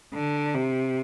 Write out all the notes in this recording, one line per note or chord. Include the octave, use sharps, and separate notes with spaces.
D3
C3